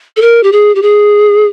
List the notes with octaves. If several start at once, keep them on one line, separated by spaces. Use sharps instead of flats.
A4
A#4
G4
G#4
G4
G#4